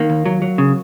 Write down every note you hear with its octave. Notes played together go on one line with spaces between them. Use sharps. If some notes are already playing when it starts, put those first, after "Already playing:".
Already playing: D#3 A#3
D#2
F#3
F#3
C#3